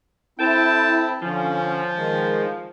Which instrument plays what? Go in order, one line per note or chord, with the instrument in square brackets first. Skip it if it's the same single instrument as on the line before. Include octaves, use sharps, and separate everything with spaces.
[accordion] C4 E4 [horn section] A4 G5 A5
[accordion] D3 C#4 [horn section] F3
[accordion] D#3 G#3